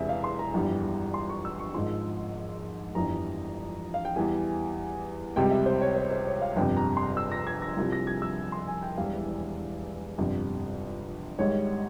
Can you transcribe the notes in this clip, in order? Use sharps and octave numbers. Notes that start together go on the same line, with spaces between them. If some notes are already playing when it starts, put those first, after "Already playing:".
Already playing: E1 E2 C3 E3 E5
F5
C6
A#5
G1 F2 E3 G3
C6
C#6
E6
C#6
G#1 G#2 F3 C6
G1 F2 E3 G3 A#5
F5
G5
E2 E3 G3 G#5
C#2 C3 G3 G5
E5
C5
C#5
C5
C5
C#5
F5
G1 F2 C3 G5
A#5
C6
E6
A#6
G#6
A#6
C2 C3 F3
A#6
G#6
E6
C6
G#5
G5
E1 E2 E3 G3 F5
G1 F2 C3
G#1 G#2 G3 C#5